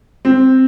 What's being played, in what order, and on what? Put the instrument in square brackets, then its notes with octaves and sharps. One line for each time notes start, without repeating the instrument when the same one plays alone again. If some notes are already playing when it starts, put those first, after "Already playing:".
[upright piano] C4